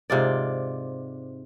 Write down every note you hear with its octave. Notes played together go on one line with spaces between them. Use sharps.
G#2 C3 F4 D5